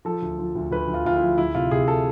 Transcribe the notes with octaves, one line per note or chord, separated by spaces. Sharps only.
F3 A4
D2
F3
D2
D2 B4
D2
F4
D2 F4
E4
F3
D2 E4
C3 F4
C3 G#4
A4